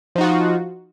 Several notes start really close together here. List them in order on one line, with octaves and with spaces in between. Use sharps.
F3 D#4 F#4 F4